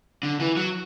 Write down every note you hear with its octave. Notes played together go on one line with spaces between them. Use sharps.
D3
E3
F#3